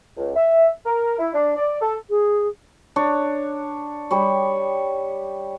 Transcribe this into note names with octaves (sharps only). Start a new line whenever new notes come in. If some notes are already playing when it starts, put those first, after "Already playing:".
C#2
E5
A#4
E4
D4
D5
A4
G#4
D4 C#5
G3 G4 C#5